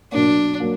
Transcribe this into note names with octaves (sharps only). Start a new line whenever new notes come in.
B2 F#3 A#3 D4
F#3 A#3